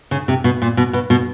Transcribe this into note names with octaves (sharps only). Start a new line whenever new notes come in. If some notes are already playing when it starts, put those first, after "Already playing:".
C#3
C3
B2
A#2
B2
B2
B2